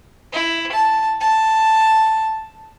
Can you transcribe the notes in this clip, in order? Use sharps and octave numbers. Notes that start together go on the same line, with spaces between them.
E4
A5
A5